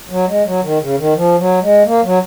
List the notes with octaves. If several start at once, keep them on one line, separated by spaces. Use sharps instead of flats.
F#3
G#3
F#3
D#3
C#3
D#3
F3
F#3
G#3
A#3
F#3